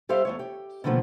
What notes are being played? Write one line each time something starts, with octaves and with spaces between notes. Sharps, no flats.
G3 G4 A4 C5 E5 F5
E2 A3 C#5
G4
B2 D3 D#3 F3 A3 A#3